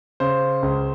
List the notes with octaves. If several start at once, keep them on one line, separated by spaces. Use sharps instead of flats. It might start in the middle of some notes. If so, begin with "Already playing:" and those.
C#3 C5
C#2